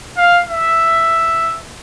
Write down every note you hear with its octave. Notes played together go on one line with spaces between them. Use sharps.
F5
E5